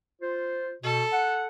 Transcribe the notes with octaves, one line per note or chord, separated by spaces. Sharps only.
F4 C5
B2 A4
F#5